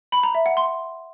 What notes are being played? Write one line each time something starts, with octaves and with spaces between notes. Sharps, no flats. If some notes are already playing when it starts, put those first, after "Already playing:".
B5
A#5
E5
F#5
C6